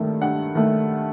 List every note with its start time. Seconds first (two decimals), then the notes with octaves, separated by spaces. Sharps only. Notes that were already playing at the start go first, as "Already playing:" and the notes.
Already playing: G2 D#3 A3
0.21 G2 F#5
0.55 D#3 A3